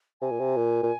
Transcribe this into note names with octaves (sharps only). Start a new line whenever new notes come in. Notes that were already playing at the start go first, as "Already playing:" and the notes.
C3 G#5
A#2
C3
A#2
A#2